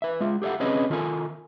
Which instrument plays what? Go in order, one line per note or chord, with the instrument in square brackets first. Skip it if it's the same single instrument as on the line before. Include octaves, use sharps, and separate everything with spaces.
[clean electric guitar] B4 E5
G#3 F4
G4 A4 C#5 E5 F#5
C4 C#4 G#4 B4 C#5 D#5
D#3 F4 A4 A#4 G#5